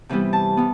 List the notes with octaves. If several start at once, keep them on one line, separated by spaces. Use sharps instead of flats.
C3 E3 G3 B3
A5
G3 B3